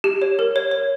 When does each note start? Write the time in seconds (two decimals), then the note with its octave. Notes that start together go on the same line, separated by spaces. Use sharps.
0.04 G4
0.22 C#5
0.39 A#4
0.56 C#5
0.71 C#5